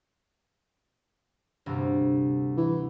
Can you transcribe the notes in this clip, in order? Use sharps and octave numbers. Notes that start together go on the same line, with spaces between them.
D2 G2 C3
E3